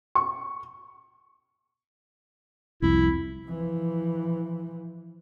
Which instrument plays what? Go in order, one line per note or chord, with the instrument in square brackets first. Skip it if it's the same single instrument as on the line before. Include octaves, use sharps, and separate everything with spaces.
[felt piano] C#6
[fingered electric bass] C2 F2 [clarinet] E4
[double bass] E3 F3